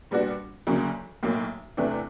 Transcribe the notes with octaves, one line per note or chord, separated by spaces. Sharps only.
A#2 G3 B3 D4 F#4
D2 C#3 F#3 A#3 C#4
B1 A2 F#3 A#3
E2 C3 E3 A3 D4